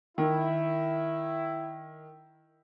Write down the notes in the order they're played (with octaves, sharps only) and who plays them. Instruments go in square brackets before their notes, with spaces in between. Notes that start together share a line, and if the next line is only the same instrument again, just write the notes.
[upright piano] D#3 [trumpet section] E4